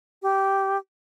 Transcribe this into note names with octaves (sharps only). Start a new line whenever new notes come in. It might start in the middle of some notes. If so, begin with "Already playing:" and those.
G4